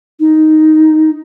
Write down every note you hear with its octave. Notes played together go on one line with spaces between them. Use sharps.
D#4